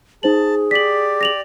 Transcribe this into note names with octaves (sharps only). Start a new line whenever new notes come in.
D#4 G#4 C5 A5 F#7
G4 D5 B6 F#7
A#6 F7 F#7